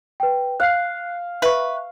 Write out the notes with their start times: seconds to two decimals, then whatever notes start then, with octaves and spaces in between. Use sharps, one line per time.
0.20 B4 G5
0.60 F5 F#6 C7
1.42 B4 E5 C#6